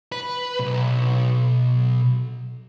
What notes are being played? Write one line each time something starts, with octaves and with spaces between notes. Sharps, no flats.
B4
B1